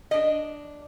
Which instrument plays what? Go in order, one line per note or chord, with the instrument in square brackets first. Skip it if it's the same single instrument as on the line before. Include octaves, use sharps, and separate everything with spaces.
[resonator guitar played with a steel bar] D4 D#5